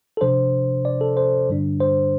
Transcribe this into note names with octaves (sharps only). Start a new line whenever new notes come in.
A4
C3 F3 D4 C5
D5
A4
C5
G2 D3 G3 D4
C5